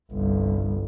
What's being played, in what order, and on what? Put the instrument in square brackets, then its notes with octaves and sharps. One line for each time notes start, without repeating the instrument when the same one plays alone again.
[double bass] G1 C2